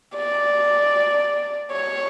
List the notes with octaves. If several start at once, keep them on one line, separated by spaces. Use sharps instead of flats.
D5
C#5